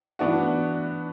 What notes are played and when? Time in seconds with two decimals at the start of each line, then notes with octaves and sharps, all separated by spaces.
0.19 E3 B3 D4 F#4